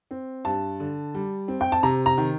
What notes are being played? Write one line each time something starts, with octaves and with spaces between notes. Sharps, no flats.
C4
G2 A5
D3
G3
C4
G5
A5
C3 A#5
A#5
D#3